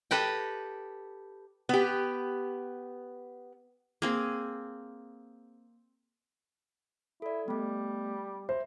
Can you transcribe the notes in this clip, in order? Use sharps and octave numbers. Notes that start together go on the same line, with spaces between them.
G4 A4 B4 D#5 G5
B3 G4
A#3 C4 G#4
E4 A4 D5
G3 A3 B3
C5 E5